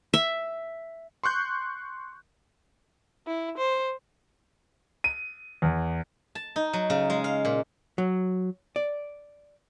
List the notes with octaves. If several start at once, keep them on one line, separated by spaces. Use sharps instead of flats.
E5
C6 C#6 F#6 G6
E4
C5
D#7
E2
A5
D#4
F#3
C#3
G#3
F5
A#2
F#3
D5